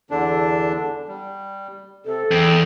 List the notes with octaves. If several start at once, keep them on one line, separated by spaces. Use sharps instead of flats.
E2 D3 D4
G3
C3 A4
E2 G5